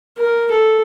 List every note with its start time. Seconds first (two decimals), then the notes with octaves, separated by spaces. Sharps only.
0.18 A#4
0.51 A4